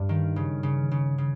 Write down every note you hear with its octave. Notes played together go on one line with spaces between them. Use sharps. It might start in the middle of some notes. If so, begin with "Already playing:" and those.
Already playing: G2
D#3
C#3
C#3
C#3
C#3